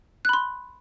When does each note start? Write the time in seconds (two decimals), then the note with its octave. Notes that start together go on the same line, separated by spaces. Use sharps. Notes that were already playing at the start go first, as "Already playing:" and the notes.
0.25 F#6
0.29 B5
0.33 C6